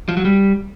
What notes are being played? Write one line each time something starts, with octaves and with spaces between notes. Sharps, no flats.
F3
F#3
G3